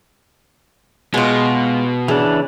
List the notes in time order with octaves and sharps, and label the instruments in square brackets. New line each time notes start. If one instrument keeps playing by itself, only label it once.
[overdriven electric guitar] B2 [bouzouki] G#3 F4 [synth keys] B3
[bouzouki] C#3 [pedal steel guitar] E3 D4